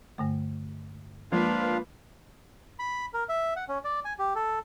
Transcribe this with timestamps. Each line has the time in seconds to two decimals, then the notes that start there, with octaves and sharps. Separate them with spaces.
0.18 G2 D3 A3
1.32 F3 G#3 A#3 D4 F4 B4 F5
2.79 B5
3.14 A#4
3.29 E5
3.56 F#5
3.68 C#4
3.84 D5
4.05 G#5
4.19 G4
4.35 A4